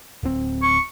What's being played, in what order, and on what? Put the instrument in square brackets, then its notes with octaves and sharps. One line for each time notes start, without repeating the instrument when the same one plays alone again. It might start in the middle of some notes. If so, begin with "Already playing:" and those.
[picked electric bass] D1 C4
[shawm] C#6